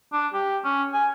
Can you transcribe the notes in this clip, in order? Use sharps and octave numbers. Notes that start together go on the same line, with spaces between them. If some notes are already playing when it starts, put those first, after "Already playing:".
D4
G4
C#4
G#5